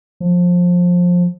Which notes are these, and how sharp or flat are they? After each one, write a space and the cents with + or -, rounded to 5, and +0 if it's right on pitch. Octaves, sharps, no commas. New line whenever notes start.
F3 +20